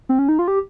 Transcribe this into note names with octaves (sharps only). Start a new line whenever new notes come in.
C4
C#4
D#4
F4
G4